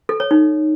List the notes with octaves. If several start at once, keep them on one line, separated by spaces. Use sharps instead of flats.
A4
C#5
D#4